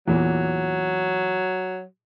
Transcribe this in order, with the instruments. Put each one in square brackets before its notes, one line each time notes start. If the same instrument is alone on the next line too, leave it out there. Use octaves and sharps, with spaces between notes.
[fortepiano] E2 A#2 [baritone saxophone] F#3